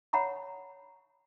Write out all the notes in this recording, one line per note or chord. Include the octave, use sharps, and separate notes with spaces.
C#5 F#5 A#5 B5 C#6